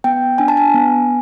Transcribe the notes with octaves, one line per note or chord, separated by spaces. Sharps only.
B3 G5
D4 G#5
A5
G#5
B3